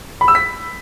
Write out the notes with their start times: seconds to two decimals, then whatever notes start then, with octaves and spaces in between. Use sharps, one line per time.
0.21 B5
0.28 E6
0.35 B6